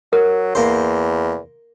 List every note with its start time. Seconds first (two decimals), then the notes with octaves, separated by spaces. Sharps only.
0.13 F#3 A#4
0.55 E2 A#3 C5